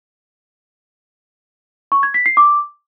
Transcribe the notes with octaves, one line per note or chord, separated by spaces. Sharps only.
C#6
G#6
B6
C7
D6